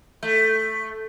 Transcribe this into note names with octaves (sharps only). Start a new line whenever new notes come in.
A3